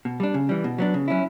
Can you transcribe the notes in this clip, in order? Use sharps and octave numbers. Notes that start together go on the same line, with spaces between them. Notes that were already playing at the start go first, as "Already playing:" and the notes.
B2
G3 D4
C#3
E3 G3
B2
F#3 B3 D4
C#3
F#3 C#4 E4